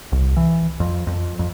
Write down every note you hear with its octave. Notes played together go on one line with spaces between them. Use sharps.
C2
E3
F2
F2
F2